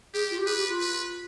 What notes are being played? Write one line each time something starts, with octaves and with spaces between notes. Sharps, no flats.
G4 G#4
F4
G4
G#4 B4
G4
F4
B4